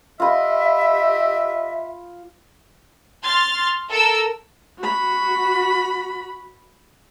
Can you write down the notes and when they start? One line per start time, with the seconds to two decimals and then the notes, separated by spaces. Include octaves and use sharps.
0.20 F4 G4 D#5 E5 B5
3.24 C6 F6 A6
3.89 A4 A#4 E6
4.78 F#4 B5